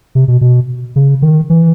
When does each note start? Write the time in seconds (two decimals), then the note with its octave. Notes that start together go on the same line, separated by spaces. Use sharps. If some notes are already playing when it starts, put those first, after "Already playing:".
0.15 C3
0.28 B2
0.41 B2
0.96 C#3
1.22 D#3
1.50 E3